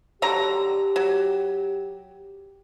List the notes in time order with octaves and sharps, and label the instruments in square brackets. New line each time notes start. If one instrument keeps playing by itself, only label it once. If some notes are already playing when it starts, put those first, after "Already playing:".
[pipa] D3 F#3 A#5 [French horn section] G4
[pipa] F#3